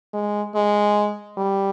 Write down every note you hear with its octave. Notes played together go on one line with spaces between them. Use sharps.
G#3
G#3
G3